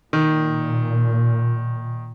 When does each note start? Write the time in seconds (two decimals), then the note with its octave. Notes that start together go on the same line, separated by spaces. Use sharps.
0.13 A#2 D#3